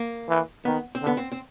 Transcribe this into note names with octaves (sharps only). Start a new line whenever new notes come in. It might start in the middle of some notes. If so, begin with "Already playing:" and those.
Already playing: A#3
E3
D#3 B3
C4
D3
B3
C4
C4